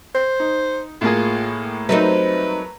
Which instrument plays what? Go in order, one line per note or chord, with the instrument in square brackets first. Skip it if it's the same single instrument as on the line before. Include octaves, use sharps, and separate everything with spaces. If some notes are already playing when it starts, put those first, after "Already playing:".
[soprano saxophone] C5
[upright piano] D#4
[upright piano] A2 A#3 G#4 [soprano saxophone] F4
[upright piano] F#3 A3 A#4 [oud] G3 C4 D#4 [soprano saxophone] B4